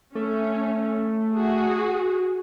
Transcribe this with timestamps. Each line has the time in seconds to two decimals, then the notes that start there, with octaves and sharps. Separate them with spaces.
0.15 A3 C#4
1.36 F#4 G#4